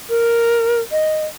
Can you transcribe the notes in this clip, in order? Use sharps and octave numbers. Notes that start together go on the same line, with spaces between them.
A#4
D#5